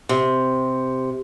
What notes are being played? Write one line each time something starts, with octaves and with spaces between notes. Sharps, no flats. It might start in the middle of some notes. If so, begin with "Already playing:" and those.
C3